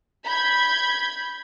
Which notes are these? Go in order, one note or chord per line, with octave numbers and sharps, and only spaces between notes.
B5 G6 G#6